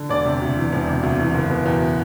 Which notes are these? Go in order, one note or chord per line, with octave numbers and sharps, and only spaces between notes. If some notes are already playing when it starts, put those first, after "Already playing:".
Already playing: D3
E1 D5
C3
D2
E3
E1
C3
D2
E3
F#1
B2
E2